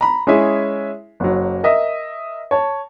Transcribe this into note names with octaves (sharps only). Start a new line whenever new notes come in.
A#5 B5
G#3 C#4 E4 G#4 E5 G#5
F#1 F#3
A#4 D#5 E5
C#5 A5